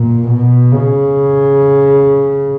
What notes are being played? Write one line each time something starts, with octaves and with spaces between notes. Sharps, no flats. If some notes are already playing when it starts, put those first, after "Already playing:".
Already playing: A#2
B2
C#3